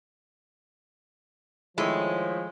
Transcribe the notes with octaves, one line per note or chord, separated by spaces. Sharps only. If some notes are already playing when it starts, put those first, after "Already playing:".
D#3 F3 G#3 A3 E4 C#5